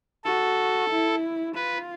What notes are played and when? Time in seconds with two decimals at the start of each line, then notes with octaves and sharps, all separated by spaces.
0.25 F#4 A4
0.90 E4
1.55 F4 B4